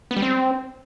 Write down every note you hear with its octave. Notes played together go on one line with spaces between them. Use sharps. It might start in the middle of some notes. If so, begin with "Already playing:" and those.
B3
G3
C4